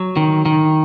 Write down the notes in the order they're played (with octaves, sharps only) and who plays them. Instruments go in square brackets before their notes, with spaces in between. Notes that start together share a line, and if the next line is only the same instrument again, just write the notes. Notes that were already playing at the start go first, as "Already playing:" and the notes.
Already playing: [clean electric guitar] F#3
D#3
D#3